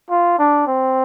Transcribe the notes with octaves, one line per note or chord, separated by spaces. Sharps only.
F4
D4
C4